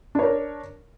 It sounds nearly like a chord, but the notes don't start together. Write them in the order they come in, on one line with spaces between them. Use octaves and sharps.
D4 C#5 A#4